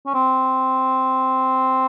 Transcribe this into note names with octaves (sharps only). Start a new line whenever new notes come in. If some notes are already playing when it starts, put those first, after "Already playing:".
C#4
C4